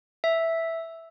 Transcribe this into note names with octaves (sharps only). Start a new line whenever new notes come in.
E5